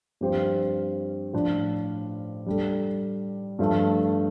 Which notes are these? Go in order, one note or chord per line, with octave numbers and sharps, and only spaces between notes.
G2 F3 C4 G4 C5
A2 F3 D4
G3 D4 A4
G2 F3 A3